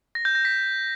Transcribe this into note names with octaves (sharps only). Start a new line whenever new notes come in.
A#6
G6
A#6
B6